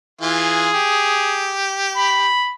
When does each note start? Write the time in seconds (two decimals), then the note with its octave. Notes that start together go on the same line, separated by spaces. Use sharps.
0.21 E3 F4 G#4
0.74 G4
1.97 B5